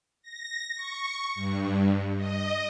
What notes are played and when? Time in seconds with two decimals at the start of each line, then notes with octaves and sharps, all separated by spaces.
0.23 A#6
0.75 C#6
1.35 G2
2.17 D#5